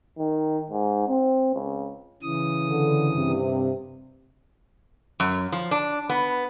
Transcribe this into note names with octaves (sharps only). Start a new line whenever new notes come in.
D#3
G#2
C4
C#2
C#3 E3 D#6
D3
G2 C3
F#2
F3
D4
B3